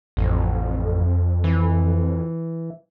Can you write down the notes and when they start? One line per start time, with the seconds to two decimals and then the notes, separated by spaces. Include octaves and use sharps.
0.17 A1 F2
1.44 E3